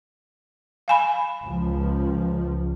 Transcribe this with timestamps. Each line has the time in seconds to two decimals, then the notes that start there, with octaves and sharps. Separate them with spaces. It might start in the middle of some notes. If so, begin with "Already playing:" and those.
0.88 F5 G#5 B5
1.46 C#2 F3